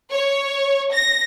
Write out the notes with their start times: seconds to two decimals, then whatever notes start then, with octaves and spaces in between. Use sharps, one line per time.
0.12 C#5
0.93 A#6